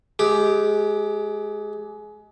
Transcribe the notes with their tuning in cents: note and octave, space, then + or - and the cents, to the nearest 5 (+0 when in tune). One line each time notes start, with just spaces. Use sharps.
G#3 +25 G4 +0